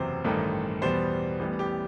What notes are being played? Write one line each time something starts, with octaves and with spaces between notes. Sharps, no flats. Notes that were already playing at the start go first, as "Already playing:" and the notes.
Already playing: F#1 E2 C3 F#3 C5
A1 G2 D#3 A3
E2 B2 G3 B3 C5
A1 A2 G3 B3
G4